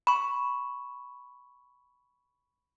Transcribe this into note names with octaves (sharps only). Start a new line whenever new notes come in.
B5 C#6